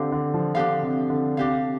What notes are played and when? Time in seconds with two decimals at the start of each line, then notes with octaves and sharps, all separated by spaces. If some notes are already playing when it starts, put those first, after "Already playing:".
Already playing: D3 C4 D4 G4 F5
0.12 D3
0.34 F3
0.55 D3 D4 G4 F5
0.82 C3
1.10 D3
1.37 C3 D4 G4 F5